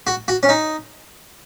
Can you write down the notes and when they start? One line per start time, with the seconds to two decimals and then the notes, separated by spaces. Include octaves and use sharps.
0.07 F#4
0.28 F#4
0.43 C#4
0.49 D#4